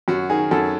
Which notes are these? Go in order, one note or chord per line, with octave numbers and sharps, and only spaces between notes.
F#2 F#4
D#3 G#4
F#2 A4